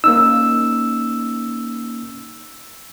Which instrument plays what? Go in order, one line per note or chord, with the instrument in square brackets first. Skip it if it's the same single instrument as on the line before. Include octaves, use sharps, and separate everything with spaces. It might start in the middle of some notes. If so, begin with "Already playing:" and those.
[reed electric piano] A#3 C#4 D#4 [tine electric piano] E6